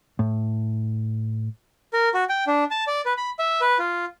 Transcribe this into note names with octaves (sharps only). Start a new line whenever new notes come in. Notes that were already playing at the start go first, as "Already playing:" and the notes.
A2
A#4
F#4
G5
D4
A5
D5
B4
B5
E5
B4
F4